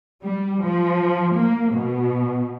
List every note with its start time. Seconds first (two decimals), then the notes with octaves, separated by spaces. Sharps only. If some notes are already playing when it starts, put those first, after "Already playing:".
0.23 G3
0.62 F3
1.35 A#3
1.72 B2